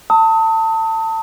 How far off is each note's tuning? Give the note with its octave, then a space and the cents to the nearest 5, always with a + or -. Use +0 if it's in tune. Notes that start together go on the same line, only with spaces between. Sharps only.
A5 +30 D#6 +35